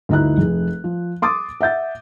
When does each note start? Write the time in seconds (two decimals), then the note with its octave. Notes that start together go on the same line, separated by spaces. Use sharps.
0.09 D2 G2 D#4 E4 A#5 F#6
0.38 F1 G#4
0.84 F3
1.22 C6 D6 D#6 A6
1.61 E5 F#5 G6 A6